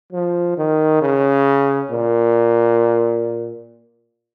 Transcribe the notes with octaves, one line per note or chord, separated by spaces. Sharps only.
F3
D#3
C#3
A#2